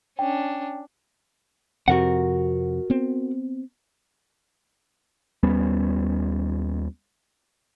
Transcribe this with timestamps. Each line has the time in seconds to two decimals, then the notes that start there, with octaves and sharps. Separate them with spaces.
0.19 C#4 D4 G5
1.88 F2 C3 F#4 A#4 F#5
2.90 B3 C4
5.43 D#2 G3 B3 C#4